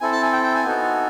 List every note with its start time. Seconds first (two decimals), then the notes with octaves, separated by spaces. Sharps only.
0.01 C4 E4 A4 G#5
0.12 A5
0.23 G#5
0.33 G5
0.43 G5
0.55 G#5
0.65 B3 D#4 F#4 A4